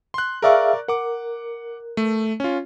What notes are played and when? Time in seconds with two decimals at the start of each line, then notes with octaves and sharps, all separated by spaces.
0.14 C6 F#6
0.42 G#4 A#4 D5 E5 F5 C#6
0.88 A#4 F#5 D6
1.97 A3
2.40 C#4 F4